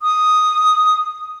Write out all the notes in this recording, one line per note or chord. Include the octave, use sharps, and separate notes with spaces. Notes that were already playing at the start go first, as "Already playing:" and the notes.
D#6